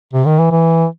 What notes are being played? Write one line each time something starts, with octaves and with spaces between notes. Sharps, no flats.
C3
D#3
E3
E3